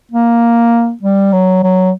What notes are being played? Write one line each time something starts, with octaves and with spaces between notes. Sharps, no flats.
A#3
G3
F#3
F#3